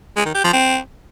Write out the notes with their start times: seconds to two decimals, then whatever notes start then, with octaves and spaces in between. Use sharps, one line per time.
0.16 G#3
0.26 D#3
0.35 G4
0.44 F3
0.53 C4